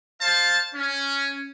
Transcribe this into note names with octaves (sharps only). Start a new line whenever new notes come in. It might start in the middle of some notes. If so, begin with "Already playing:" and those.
C5 F5 A5
C#4